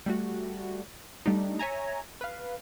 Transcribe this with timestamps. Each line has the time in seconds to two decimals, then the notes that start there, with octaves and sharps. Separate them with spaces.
0.06 G3 A3 F#4
1.26 G3 A3 D4 D#4
1.59 C#5 E5 G#5 A#5
2.21 B4 F5